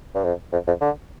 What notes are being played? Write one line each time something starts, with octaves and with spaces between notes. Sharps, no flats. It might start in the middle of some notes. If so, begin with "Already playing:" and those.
G2
F2
F2
F2
D3